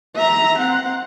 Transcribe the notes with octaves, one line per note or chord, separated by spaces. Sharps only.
E5 A#5
C4 F#5